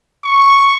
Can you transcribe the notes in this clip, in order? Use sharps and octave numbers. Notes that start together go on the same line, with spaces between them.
C#6